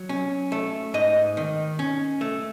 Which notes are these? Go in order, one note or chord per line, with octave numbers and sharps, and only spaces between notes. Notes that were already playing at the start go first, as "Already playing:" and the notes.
Already playing: F#3
C#4
A3
G#2 D#5
D#3
C#4
A3